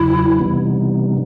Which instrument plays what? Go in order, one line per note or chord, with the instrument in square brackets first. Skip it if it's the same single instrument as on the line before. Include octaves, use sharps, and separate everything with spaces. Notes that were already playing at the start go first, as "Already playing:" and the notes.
Already playing: [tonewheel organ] E2 C#3 F#3 [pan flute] E4
[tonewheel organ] C3 E3 G3 B3 D#4